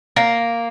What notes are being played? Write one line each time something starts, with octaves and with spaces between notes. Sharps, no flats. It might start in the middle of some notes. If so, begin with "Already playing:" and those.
A#3